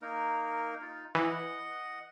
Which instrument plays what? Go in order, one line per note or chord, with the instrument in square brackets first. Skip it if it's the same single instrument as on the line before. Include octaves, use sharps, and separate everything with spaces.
[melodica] A#3 D#4 A#4
D#4 F4
[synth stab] E3 [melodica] D#5 F#5